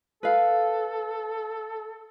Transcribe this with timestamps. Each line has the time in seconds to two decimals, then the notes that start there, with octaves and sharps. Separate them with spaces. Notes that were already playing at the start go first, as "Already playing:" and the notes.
0.23 A4 B4 F5